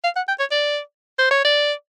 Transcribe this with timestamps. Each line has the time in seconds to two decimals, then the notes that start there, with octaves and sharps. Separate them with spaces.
0.04 F5
0.16 F#5
0.28 G5
0.40 C#5
0.51 D5
1.19 C5
1.31 C#5
1.45 D5